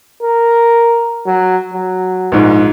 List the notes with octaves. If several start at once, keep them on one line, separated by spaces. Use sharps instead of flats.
A#4
F#3
F#3
A#1 G#2